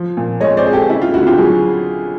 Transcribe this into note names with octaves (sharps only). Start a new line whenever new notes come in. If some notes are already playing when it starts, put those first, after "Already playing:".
Already playing: F3
A#2
G#3 C#5 D#5
C5 D5
C4 G#4
G4 A4
C#3 E4
F4
D2 E4 F#4
F4 G4
F#3 F#4 G#4